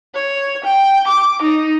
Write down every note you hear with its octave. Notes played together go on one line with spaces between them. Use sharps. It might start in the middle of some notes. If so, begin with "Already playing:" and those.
C#5
G5
D6
D#4